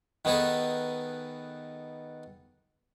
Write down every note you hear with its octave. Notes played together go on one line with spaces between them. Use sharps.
D#3 B3 D#4 G#4 A4 B4